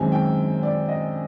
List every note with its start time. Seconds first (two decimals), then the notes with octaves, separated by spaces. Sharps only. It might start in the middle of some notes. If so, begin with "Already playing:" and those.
Already playing: F#2 D#3 G#3 C4 G#5
0.12 G5
0.63 D5
0.89 D#5